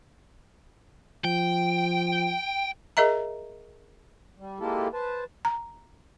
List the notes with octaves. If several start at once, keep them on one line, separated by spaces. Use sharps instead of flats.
F3 G5
G#4 A#4 D#5 E5 A#5
G3
G#3 A#3 E4 F4 G4 A4
B4 C5 A5
A#5